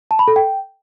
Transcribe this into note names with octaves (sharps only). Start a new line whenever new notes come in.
A5
B5
A4
G5